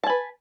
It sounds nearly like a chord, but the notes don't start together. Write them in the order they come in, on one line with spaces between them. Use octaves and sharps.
A5 G#5 B4